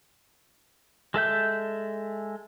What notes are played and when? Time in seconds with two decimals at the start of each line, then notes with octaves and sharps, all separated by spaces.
1.14 G#3 A4 E5 G6